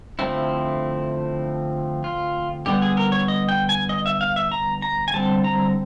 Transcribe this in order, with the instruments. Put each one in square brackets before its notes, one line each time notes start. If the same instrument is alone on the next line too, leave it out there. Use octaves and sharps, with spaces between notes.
[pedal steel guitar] D3 F3 A3 C4 E4
F4
D3 G3 B3 G4
G#4
A#4
C#5
D#5
G5
G#5
D#5
E5
F5
E5
A#5
A#5
G#5
D3 G3 C4 A5
A#5